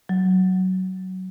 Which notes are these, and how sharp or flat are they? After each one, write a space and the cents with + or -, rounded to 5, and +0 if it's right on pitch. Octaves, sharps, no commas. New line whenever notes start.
F#3 +15